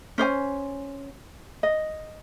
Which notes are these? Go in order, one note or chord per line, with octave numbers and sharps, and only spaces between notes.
C#4 C5 D5 G#5
D#5